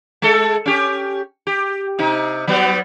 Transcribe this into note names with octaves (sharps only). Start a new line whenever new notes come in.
G#3 A4
C#4 G4
G4
C3 D#4
F#3 G3 B3